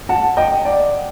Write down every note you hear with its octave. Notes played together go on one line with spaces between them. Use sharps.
F#5 A5
D#5 G5
D5 F#5